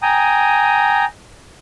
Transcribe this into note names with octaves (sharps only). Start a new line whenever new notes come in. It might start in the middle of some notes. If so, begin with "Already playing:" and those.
G5 G#5 A#5 D#6